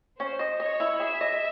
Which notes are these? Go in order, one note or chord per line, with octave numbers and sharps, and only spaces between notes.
C#4 C5
D#5
C#5 D#5
E4
G#4 E5
D#5